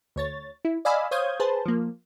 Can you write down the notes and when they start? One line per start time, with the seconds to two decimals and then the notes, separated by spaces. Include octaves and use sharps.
0.16 D2 C#5 A6
0.65 E4
0.85 D5 D#5 F5 G#5 B5 E6
1.11 C5 C#5 F5 D#6 G6 G#6
1.40 G#4 B4 C5 A5
1.65 F3 A#3